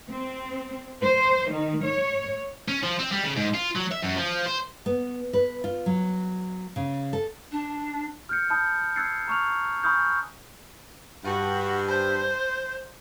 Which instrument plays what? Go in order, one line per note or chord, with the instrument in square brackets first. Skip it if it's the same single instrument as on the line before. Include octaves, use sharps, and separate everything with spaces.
[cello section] C4
C5
D#3
C#5
[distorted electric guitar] C#4
F3
C4
G3
C#3
G#2
F4
F#3
E5
F#2
F3
C5
[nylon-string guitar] B3
B4
F4
F#3
C#3
A4
[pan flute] D4
[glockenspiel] F6 G6 C#7
A5 B5 D#6 G6
E6 F#6 G#6 A6 C7 C#7
A#5 C#6 F6 F7
G#5 B5 C#6 D#6 F6 G6
[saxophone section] G2 [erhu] F#4
[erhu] C5